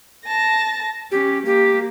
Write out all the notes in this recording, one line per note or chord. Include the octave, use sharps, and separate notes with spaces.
A5 A#6
C#4 G4
A#3 G4